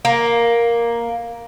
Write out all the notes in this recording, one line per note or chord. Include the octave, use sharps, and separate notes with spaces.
A#3